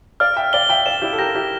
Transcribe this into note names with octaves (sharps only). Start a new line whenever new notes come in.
D5 F5 F6
E5 G5
D5 F5 G7
E5 G5
D5 F5 E7
E4 G4
A4
G4 A#4 A#6
E4 G4